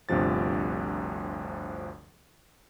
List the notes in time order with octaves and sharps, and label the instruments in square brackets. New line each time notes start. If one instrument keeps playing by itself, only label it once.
[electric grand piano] G1 D2 G2 C3 F3 A6